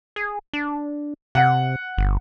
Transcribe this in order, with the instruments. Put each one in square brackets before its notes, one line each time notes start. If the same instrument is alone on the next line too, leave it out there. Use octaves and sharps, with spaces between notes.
[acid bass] G#4
D4
[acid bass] C3 [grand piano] F#5
[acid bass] G1